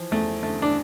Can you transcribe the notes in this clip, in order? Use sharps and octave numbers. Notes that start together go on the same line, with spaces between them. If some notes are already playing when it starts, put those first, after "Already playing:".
Already playing: E3 F3
E2 A3
D3 A3
D4